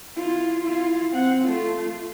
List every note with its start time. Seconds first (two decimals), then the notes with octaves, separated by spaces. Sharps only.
0.16 E4 F4
0.63 E4 F4
1.11 C4 F#5
1.42 A3 F4